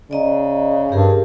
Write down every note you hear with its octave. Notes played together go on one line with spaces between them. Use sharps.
C#3 D5 D#5 A#5
G2 G4 G#4 A#4